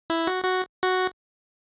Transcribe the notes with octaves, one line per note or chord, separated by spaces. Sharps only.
E4
F#4
F#4
F#4